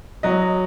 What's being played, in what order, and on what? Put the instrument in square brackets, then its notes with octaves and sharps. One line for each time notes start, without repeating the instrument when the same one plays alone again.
[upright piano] F#3 D#5